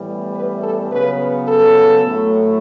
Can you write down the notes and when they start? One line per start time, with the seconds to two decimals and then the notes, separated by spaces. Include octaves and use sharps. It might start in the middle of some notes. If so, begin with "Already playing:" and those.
Already playing: A2 E3 G3 B3
0.34 B4
0.63 A4
0.91 C#3 F#3 B3 B4
1.48 A4
2.05 A2 F#3 A3